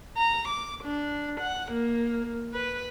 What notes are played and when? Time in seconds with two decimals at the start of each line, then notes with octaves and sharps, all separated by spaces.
0.17 A#5
0.48 D6
0.84 D4
1.40 F#5
1.71 A#3
2.53 B4